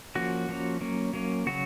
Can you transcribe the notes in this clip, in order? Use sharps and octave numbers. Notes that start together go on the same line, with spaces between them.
F3 A#3 C#4 F#4
F3 A#3 C#4
F#3 A#3 C#4
F#3 A#3 C#4
C#3 F#3 F#4